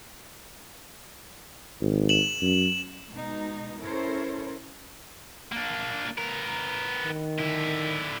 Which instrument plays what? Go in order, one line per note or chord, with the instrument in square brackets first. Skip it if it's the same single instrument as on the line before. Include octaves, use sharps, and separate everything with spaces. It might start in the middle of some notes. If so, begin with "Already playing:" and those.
[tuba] G#1
[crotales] E7 F#7
[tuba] F#2
[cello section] B2 G#3 D#4
C#4 E4 A4 A#4 C5 C#5
[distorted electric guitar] A#3 D4
B3 A#4
[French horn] D#3
[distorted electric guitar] D3 E4